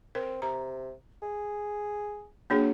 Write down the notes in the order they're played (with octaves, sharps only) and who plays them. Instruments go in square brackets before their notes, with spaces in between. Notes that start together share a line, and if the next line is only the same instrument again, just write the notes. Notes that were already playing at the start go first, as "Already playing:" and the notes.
[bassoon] C4 [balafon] A#4
[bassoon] C3 [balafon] A#5
[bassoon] G#4
[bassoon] F#3 [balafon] A#3 D4 G#4